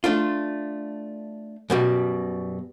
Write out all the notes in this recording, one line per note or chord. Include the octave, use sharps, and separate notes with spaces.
A3 D4 F4
F#2 B2 G3